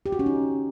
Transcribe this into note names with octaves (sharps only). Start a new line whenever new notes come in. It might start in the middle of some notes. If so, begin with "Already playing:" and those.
G4
F#4
C#4
D#4